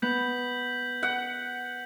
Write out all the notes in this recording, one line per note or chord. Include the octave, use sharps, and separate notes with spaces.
B3 G6 B6 F#7
F#5